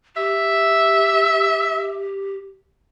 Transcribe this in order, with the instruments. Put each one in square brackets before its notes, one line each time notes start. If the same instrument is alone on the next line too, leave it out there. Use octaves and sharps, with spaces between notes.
[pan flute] G4 [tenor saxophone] E5